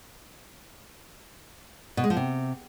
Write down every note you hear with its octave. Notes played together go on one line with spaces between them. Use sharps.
B2
G#3
F3
C3